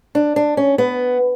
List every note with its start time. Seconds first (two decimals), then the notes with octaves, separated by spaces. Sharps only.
0.15 D4
0.36 D4
0.57 C#4
0.78 B3